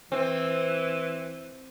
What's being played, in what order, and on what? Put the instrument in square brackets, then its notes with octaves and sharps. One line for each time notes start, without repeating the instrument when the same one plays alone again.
[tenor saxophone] E3 [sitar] C4